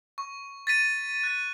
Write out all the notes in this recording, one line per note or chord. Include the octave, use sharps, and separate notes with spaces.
C#6
A6 B6 D#7
F#6 A6